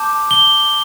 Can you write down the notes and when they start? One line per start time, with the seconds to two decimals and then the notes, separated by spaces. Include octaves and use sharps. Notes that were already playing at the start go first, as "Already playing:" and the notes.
Already playing: A5 D6 G6
0.31 G7